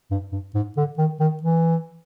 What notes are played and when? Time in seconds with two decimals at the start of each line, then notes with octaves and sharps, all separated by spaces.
0.11 G2
0.32 G2
0.55 G#2
0.77 D3
0.98 D#3
1.20 D#3
1.43 E3